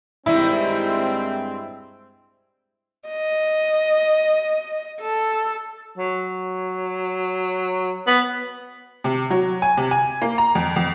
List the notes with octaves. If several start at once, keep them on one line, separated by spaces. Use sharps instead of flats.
G2 D#3 G3 G#3 A#3 C4 E4
D#5
A4
F#3
B3
C3
F#3
G#5
C3
G#5
A#3
A#5
F2
F2